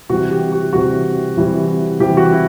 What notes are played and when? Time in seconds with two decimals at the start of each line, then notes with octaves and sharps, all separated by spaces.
0.09 C3 E3 G3 F#4
0.31 G4
0.52 F#4
0.73 C3 E3 G3 F#4
1.37 C3 E3 G3
2.00 C3 E3 G3 G4
2.17 F#4
2.32 E4